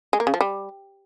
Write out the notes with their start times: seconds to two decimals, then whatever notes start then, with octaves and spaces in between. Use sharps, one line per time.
0.13 G#3
0.20 A#3
0.27 C#3
0.34 F3
0.41 G3